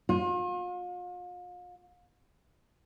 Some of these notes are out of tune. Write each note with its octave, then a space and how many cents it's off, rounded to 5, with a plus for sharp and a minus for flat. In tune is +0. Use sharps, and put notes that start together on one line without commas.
F4 +40